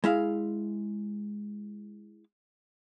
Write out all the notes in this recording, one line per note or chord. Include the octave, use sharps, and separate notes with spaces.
G#3 E4 F5